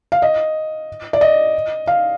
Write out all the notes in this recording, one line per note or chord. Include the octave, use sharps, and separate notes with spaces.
F5
D#5
D5
D#5
F5